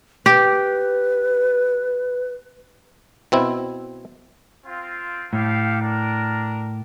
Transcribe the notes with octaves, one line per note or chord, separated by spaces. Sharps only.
G4 B4
B2 C4 E4
C4 F4
A2 G4 A4 F5
D4 A#4